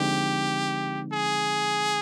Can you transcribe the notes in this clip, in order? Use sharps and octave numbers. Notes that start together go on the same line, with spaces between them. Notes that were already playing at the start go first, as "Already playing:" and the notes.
Already playing: D3 F3 G#3 C4 D#4 G4
G#4